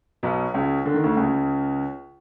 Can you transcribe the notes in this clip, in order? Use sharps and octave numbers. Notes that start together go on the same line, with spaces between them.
B1 B2
C#2 C#3
D3
D#3
D2 D3
C#2 C#3